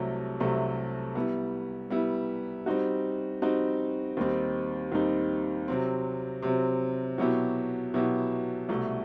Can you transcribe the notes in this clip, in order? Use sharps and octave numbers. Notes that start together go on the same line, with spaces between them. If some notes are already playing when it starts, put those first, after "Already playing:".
Already playing: C2 C3 F#3 A3
C2 C3 F#3 A3
G3 B3 E4
G3 B3 E4
G3 C4 D#4 F#4
G3 C4 D#4 F#4
D#2 D#3 G3 C4 D#4
D#2 D#3 G3 C4 D#4
C3 F#3 C4
C3 F#3 C4
B2 F#3 B3 E4 G4
B2 F#3 B3 E4 G4
C2 B2 A3